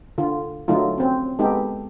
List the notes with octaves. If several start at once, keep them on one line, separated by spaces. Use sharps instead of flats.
D3 F4
D3 F#3 A3 D#4 F4
C4 C#4
G#3 B3 D#4 G4 A4